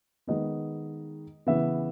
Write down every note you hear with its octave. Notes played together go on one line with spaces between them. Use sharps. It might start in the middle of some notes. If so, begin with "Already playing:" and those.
D#3 G#3 B3 D#5
C#3 E3 B3 E5